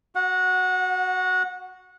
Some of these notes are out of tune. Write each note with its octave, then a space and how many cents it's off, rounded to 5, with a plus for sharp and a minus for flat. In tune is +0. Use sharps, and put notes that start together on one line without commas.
F#4 +0 F#5 -25